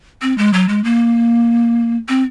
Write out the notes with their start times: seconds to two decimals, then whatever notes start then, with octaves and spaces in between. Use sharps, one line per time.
0.22 C4
0.38 G#3
0.53 F#3
0.69 G#3
0.84 A#3
2.09 C4